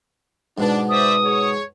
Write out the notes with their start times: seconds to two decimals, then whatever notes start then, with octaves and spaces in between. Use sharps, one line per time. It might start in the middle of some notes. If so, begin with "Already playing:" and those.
0.58 G#2 B2 B3 D4
0.89 C5 D5 E5 D#6
1.24 G#4 C#5